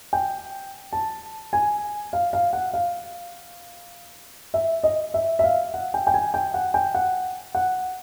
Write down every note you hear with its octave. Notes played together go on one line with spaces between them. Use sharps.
G5
A5
G#5
F5
F5
F#5
F5
E5
D#5
E5
E5
F5
F#5
G5
G5
G#5
G5
F#5
G5
F#5
F#5